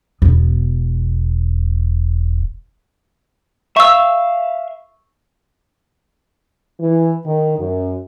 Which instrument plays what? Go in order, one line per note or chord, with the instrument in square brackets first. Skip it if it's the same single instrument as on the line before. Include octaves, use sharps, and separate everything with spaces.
[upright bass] E1 B3
[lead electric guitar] E5 F5 [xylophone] C#6 E6
[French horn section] E3
D#3
F#2